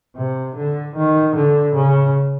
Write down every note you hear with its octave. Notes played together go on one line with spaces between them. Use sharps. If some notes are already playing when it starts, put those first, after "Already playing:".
C3
D3
D#3
D3
C#3